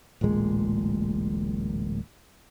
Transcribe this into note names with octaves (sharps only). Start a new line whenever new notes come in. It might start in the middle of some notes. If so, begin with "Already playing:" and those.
D1 A1 A#2 G#3